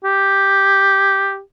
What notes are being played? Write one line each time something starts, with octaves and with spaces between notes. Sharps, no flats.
G4